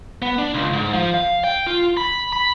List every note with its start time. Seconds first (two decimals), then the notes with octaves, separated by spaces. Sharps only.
0.22 B3
0.38 D4
0.54 C#2
0.73 G#2
0.93 F3
1.14 F5
1.44 G5
1.66 F4
1.97 B5
2.33 B5